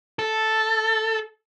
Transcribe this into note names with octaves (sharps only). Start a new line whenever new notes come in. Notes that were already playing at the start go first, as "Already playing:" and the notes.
A4